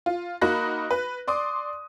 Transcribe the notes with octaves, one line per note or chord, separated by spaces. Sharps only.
F4
A#3 D#4 F#4 B5 F#6 A#6
B4
D5 C6 D6 D#6